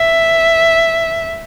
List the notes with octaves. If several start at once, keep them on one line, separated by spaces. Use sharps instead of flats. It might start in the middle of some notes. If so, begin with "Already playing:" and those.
Already playing: E5